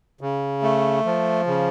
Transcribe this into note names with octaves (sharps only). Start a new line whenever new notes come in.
C#3
A3
F3
C#3